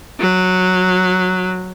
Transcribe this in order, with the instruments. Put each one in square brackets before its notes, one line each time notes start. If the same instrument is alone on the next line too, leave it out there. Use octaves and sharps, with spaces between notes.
[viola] F#3